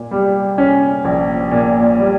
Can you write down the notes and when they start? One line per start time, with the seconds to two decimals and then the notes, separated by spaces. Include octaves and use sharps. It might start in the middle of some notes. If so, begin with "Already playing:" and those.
Already playing: A#2
0.11 G3
0.58 C#4
1.05 A#1
1.52 A#2
1.98 G3